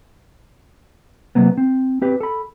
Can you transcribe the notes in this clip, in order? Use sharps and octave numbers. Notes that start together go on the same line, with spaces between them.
C3 F3 F#3 A#3 B3
C4
C4 G4 B4
A4 B5